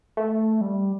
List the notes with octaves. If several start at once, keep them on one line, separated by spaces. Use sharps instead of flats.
A3
G3